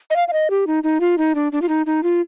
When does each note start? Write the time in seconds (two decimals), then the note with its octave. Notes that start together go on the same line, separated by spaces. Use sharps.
0.10 D#5
0.16 F5
0.28 F5
0.33 D#5
0.50 G4
0.67 D#4
0.84 D#4
1.00 F4
1.18 D#4
1.35 D4
1.52 D4
1.62 F4
1.69 D#4
1.86 D#4
2.03 F4